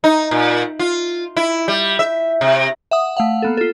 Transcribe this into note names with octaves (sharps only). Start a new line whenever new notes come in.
D#4
A#2
F4
E4
G3
E5
C3
E5 F#5 D#6
A3 F5 F#5
A#3 B3 A4
F4 A4